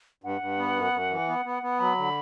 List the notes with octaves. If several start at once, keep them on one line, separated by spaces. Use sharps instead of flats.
G2 F#5
G2
B3
F#2
F#2
E3
B3
B3
B3
F#3 B5
D3